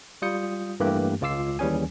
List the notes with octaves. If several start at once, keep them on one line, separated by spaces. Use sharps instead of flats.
G3 F4 D#6 G6 C#7
G2 E3 A3 A#3 G4 F#6
C#2 G#3 F4 D6 E6 C7
D#2 E3 G3 C#4 G#4 G#5